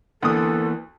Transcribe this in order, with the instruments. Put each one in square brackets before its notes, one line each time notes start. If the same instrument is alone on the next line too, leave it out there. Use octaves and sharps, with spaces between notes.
[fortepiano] D2 D#6 [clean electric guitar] E3 A#3 B3 [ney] A4